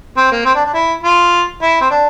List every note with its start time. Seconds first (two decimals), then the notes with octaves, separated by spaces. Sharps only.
0.17 C4
0.32 A#3
0.45 C4
0.55 D4
0.65 D4
0.74 E4
1.03 F4
1.62 E4
1.81 C4
1.91 D4